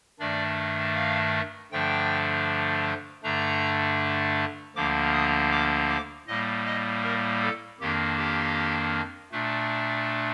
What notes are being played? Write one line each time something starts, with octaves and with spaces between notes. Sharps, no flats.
G2 D#3 A3 D4 D5
F5
G2 D3 F3 A3 D4 G5
G2 D3 A3 D4 A#5
D2 D3 F3 A#3 D4 D6
D#6
D6
D6
A2 G3 A#3 D#5
D#5
A#4
A4
F2 D#3 A#3 D4 G4
G4
A#2 A3 D4